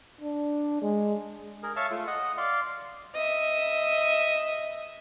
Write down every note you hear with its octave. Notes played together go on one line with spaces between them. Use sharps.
D4
G#3
G#4 A#4
C#5 E5 F5 A5
A3 F4
D#5 F#5
D5 F5 C6
D#5 E5